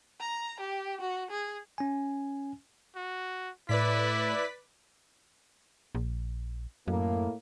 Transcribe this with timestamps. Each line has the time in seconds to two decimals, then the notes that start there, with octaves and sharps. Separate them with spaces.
0.20 A#5
0.60 G4
1.01 F#4
1.30 G#4
1.78 C#4 G#5
2.96 F#4
3.69 A2 E4 B4 D5 B6
5.95 A#1
6.88 F#2 A2 A#3